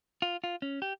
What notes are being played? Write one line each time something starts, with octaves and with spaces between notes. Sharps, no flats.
F4
F4
C#4
G4